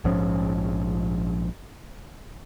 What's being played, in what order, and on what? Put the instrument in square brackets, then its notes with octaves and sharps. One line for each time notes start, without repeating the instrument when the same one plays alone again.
[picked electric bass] A#1 G#2 F3 C#4